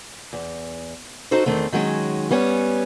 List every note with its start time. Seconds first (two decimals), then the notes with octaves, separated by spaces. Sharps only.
0.33 E2
1.31 D#4 F#4 A4 C5
1.46 E2 D#3 A3 C4
1.73 D#3 F#3 G#3 C#4
2.31 G3 B3 C#4 C#5